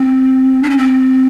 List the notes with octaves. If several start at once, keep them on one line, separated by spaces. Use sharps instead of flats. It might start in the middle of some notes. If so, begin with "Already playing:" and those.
Already playing: C4
D4
C#4
C4